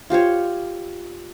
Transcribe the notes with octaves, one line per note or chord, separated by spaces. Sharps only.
F4 G4 C5 C#5